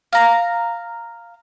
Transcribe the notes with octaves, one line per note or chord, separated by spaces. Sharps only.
F5 A#5